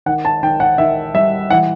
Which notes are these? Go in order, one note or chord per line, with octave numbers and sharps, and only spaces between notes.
D#3 F#5
A5
D#3 G5
F#5
D#3 E5
G3 E5
E3 F#5